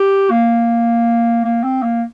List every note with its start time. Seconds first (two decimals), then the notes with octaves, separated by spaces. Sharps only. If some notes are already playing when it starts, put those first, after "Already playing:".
Already playing: G4
0.30 A#3
1.45 A#3
1.64 C4
1.83 A#3